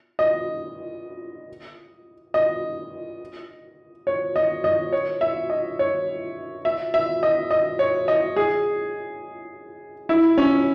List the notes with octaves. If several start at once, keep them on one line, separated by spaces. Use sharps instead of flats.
D#5
D#5
C#5
D#5
D#5
C#5
E5
D#5
C#5
E5
E5
D#5
D#5
C#5
D#5
G#4
E4
C#4